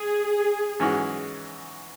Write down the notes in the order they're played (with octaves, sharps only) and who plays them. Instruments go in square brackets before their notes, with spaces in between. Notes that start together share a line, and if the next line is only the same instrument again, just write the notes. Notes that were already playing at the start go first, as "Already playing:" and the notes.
Already playing: [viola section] G#4
[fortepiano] G#2 E3 G#3 C#4 F#4